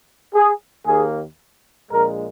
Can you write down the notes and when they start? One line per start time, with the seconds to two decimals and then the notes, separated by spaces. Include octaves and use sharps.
0.33 G#4
0.86 D#2 D#3 A#3 G#4
1.90 A#1 A#2 G#3 A#4